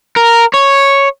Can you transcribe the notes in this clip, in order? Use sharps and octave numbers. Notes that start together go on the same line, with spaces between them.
A#4
C#5